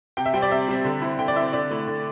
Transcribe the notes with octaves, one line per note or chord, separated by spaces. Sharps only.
C3 G5
E5
G3 C4 G5
D5
C3 E5
G3 C4
D3
C4 E4
D3 G5
D5
C4 E4 E5
D3 D5
A3 E4
D3